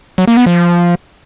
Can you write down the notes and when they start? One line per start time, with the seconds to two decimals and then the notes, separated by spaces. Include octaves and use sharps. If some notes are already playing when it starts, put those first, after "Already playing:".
0.18 F#3
0.28 A#3
0.37 B3
0.46 F3